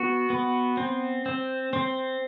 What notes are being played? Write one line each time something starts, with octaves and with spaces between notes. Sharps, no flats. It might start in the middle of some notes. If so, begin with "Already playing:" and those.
Already playing: B3 F#4
B3
C4
C4
C4